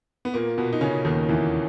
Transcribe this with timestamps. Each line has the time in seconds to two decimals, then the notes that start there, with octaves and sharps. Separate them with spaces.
0.25 B3
0.34 A#2 A#3
0.58 B2 B3
0.73 D#4
0.81 C#3 C#4
1.05 D#2 D#3
1.29 E2 E3